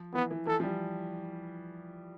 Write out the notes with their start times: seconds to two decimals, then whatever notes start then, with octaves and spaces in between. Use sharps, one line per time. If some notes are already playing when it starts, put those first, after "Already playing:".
Already playing: F3
0.14 E3 B3
0.31 E3
0.47 E3 A4
0.60 F3
0.63 G3